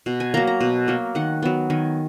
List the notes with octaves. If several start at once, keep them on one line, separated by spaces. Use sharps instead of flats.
B2
G#5
F#3 A#3 A#5
A#5
B2
F#3 A#3
D#3 F#5
F#3 B3
D#3 G#5